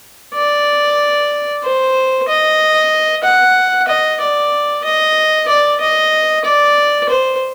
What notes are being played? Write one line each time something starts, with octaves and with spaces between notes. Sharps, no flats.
D5
C5
D#5
F#5
D#5
D5
D#5
D5
D#5
D5
C5